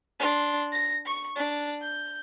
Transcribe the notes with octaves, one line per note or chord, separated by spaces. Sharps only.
D4 C6
A#6
C#6
D4
G6